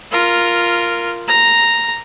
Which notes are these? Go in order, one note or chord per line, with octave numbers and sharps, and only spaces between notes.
F4 A#4
A#5